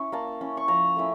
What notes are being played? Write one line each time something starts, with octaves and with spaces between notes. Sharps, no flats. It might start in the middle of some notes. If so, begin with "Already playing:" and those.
Already playing: C#4 E4 C#6
A#3 A5
C#4 E4
C#6
F3 A#5
A3 C#4 E4